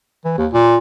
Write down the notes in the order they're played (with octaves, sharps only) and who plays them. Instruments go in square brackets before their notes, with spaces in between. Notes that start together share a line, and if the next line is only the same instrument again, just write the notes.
[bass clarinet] E3
D#2
A#2